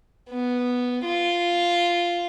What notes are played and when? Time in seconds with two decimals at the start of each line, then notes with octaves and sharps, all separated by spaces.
0.30 B3
1.05 F4